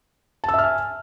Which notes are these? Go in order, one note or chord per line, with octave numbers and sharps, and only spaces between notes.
E5 G#5 A5 E6 F6